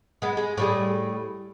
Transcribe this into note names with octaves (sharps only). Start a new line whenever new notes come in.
G#3 B3
G#3
A2 G3 G#4